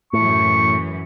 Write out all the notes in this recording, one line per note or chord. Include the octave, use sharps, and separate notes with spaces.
F#2 A2 E3 C#6